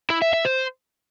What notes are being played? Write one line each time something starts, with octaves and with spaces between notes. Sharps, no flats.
E4
E5
E5
C5